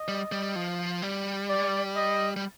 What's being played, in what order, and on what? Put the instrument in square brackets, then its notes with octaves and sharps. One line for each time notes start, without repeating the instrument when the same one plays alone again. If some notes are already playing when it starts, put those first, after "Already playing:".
Already playing: [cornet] D#5
[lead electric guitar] G3
G3
F3
G3
[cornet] D5
D#5
[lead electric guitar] G3